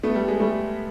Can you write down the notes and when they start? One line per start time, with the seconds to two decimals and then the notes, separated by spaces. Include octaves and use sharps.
0.03 A3 B3
0.15 G3
0.28 G#3
0.40 G3 A3